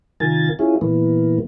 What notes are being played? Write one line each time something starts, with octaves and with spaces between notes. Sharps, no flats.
C3 D#3 F4 A#4 G#5 A6
C#4 E4 F4 G#4
A#2 E3 A#3 B3